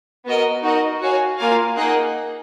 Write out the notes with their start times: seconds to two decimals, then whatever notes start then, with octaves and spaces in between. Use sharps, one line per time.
0.25 B3 F#4 A#4 D#5
0.63 D#4 F#4 A#4 D#5
1.00 F#4 C#5 F5 G#5
1.38 A#3 F4 A#4 F5 G#5
1.77 A#3 D#4 G#4 D#5 F#5